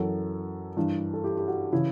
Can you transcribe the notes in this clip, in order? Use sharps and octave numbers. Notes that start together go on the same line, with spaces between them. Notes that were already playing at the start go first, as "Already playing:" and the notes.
Already playing: F#2 E3 F#4 A4
G2 E3
A4
E4 G4
G4
F#4
C#3 E3 E4